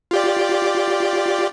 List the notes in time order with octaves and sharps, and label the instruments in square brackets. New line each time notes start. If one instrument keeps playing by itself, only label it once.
[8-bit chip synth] F4 G4 D5